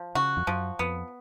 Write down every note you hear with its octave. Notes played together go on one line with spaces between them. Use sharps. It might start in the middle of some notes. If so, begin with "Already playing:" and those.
Already playing: F3
C#3 F#4
F2
F#2 F3
F2 B3